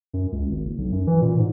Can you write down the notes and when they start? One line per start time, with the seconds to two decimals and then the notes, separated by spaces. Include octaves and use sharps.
0.14 F#2
0.32 C#2
0.50 G#1
0.65 F#1
0.78 B1
0.92 F#2
1.07 E3
1.22 A#2
1.39 G#2